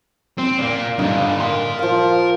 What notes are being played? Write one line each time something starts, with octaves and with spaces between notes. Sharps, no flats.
C4
A#2 A#3
G2 D3 D#4 F5
A#4 C6
F3 F5